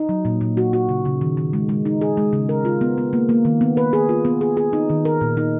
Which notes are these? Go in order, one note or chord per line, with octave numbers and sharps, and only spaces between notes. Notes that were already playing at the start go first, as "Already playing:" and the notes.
Already playing: D#4
F#3
A#2
A#2
F#4
F#4
C#3
C#3
D#3
D#3
G#3
G#3
D#4
G#4
G#3
C#3
A#4
F4
B3
B3
A#3
A#3
D#3
B3
B4
G#4
F4
B3
G#4
G#4
D#4
D#3
A#4
A#2
D#4